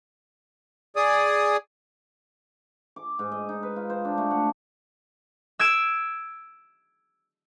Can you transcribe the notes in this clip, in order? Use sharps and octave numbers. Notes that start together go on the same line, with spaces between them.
G#4 D5 D#6
D6
G#2
D#5
D#4
B4
F4
C5
D4
A3
F#5
E6 G#6 D7 E7